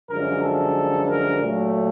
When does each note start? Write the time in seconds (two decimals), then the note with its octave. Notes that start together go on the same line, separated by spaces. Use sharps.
0.10 F#2 D3 F3 G#3 A#4
0.43 A4
1.09 A#4
1.42 A#2 F#3 A3